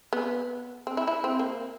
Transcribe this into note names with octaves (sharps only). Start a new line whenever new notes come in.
B3
C4
E4
E4
C4
A#3